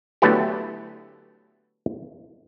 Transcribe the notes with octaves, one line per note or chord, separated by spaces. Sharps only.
D3 F#3 A3 B3 E4 G4